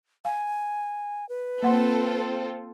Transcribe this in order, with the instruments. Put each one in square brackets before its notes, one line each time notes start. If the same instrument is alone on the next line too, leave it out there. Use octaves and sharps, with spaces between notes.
[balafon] F5 [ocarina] G#5
[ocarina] B4
[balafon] A#3 F#5 C6 [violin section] C4 F4 A4